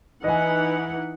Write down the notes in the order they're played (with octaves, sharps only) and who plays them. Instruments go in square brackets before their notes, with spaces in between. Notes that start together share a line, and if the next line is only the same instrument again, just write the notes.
[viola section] E3 D#4 F#5 [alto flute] B4 [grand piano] D#5 G#5